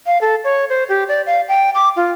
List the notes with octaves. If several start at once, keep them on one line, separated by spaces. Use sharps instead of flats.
F5
A4
C#5
C5
G4
D5
F5
G5
D6
F4